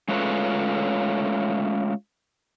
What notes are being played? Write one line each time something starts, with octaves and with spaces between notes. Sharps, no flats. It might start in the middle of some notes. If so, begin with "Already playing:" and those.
G#3 A3 C#4 F4 B4 C#5